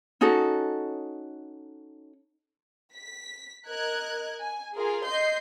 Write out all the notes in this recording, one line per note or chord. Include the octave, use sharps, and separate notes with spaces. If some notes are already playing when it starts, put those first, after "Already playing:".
C#4 D#4 F#4 A4
B6
A#4 D#5 F#6 G#6
G#5
F4 G#4 A#4
D#5 C6 G6 C7